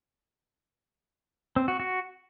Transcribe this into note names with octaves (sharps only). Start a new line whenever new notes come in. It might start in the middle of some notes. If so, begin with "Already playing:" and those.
C4
F#4
F#4